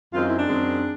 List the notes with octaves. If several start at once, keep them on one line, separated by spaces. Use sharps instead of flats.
F#2 D#3 G#3 C4 F4
E4
D4
F#2 D#3 G#3 C4